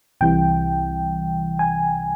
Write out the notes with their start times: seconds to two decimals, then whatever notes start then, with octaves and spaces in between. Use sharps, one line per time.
0.21 C2 C3 E3 G3 G5
1.59 G#5